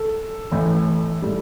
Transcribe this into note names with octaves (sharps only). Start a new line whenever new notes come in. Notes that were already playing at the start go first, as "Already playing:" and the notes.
Already playing: A4
A1 A2 E3
A2 G3